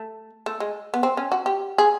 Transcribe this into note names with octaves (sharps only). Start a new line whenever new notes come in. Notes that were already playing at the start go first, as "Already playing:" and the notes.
Already playing: A3
A3
G#3
B3
C4
C#4
F#4
G4
G#4